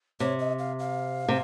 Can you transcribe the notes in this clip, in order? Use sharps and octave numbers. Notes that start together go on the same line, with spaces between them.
C3 C#5
D#5
F5
F5
C3